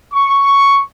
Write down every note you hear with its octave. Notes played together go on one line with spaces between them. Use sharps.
C#6